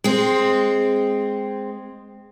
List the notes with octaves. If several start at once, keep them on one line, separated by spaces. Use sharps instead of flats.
G#3 C4